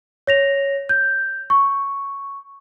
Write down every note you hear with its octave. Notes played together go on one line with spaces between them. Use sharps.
C#5 A#6 F7
G6
C#6